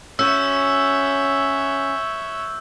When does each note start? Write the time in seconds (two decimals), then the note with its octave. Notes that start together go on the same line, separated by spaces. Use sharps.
0.19 C#4 F#4 C#5 E5 E6 F#6 G6